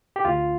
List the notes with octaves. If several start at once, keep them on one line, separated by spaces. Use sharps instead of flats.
G4
D2 F4